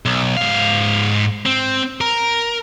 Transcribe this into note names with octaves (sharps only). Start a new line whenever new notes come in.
B1
G#2 F5
C4
A#4